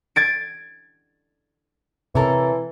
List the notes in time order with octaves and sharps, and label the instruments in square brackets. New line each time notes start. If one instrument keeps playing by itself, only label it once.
[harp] G#6 A6 D7
[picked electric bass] C3 [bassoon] E3 [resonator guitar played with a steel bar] A4 A#4 C#5